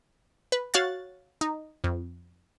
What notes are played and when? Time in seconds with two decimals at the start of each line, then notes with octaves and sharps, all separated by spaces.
0.52 B4
0.74 F#4 C#5 F5 F#6 A6
1.41 D#4
1.84 F2